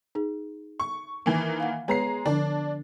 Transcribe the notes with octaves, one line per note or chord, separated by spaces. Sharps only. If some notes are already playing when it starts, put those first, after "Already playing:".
D#4 G#4
C#6
D#3 E3 A#3
F5 F#5
G#3 B3 B4 C#5 A#5 C7
D3 F3 D4